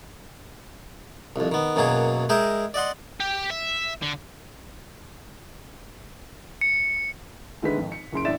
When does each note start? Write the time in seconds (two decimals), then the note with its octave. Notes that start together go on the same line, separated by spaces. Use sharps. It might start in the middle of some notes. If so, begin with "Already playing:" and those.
1.36 C2 F2
1.52 D#3 B3
1.76 F#2 B2 F#3 A#3 G#4
2.29 G#3 G#4 A#4 D#5 E5 G5
2.74 D5 D#5 F#5 C6
3.20 G4
3.50 E5
4.02 D3
6.61 C#7
7.62 D2 D3 D#3 G#3 B4 B6
7.77 G#1 F2
7.92 C#7
8.12 F#1 C#3 C6 D7
8.25 A1 D4 E5 A6 E7